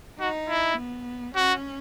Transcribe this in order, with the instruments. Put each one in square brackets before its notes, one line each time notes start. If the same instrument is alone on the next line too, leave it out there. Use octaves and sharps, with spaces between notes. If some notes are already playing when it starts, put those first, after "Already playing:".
[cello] D#4 [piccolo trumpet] F#4
[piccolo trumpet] E4
[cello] B3
[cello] C#4 [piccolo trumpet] F#4